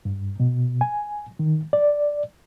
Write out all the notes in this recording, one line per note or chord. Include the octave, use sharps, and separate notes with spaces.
G2
B2
G#5
D#3
D5